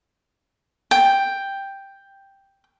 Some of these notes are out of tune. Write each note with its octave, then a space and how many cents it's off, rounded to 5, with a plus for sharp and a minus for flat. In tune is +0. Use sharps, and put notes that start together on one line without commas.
G5 +5